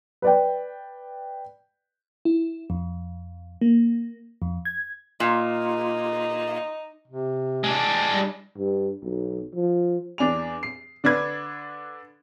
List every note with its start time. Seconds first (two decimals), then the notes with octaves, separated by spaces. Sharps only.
0.22 B4 D5 G5
2.25 E4
2.70 F2
3.61 A#3
4.42 F2
4.65 G#6
5.20 A#2 D#4
7.07 C3
7.64 G#3 D4
8.12 G3
8.58 G2
9.03 B1
9.55 F3
10.18 E2 D4 G#5 F7
10.63 C7
11.04 D3 D4 B4 G#6